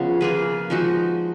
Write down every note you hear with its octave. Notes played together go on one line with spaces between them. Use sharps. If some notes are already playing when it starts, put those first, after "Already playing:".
Already playing: C#3 F3 B3
A#3 F4 G#4 B4
F3 G#3 D#4 F#4